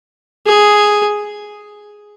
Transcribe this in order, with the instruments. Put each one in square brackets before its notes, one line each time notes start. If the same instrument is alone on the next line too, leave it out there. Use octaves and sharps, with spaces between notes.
[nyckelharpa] G#4